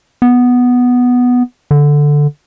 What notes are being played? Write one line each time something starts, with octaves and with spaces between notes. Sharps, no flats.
B3
D3